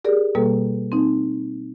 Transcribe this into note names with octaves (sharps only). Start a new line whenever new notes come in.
G4 G#4 A#4 D5
B2 G3 A#3 A4
C4 D#4